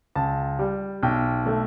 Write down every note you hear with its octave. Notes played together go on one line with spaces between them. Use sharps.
C#2 A5
G3
B1 G5
A3